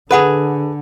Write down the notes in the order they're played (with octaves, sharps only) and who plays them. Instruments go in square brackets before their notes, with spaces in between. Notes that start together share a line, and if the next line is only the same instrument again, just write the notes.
[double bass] D3 [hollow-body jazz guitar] G#4 B4 [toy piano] A4 F#5 B5